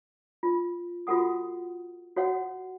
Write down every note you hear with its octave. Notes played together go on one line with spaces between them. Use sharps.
F4
F4 F#4 A4 F#5 D#6
F#4 C#5 F5 F#5